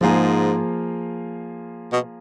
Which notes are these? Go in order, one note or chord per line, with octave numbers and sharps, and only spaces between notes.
G#2 F3 A#3 F4 G#4
B2